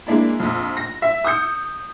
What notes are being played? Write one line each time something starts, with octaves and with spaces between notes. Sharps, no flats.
G#3 A#3 D4 E4
A#1 F2
A#6
E5
D#6 E6 G6 C#7